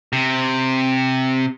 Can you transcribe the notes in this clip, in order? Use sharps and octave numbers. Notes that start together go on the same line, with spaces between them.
C3